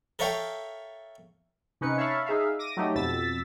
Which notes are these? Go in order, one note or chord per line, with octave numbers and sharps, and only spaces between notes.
A4 A#4 C#5 E5 F5 G5
C3 C#4 D#4 B4 C#7
C#5 E5 F5 A5 B5 C#6
D#4 G#4 E5 F5
D6 A#6 D#7
F#3 A3 D#4 G4
F2 B2 E6 A6 B6